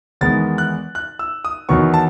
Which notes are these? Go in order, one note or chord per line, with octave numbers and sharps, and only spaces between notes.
E2 D#3 G#3 B3 A6
F#6
F#6
E6
D#6
E2 D#3 F#3 B3 C#6
A5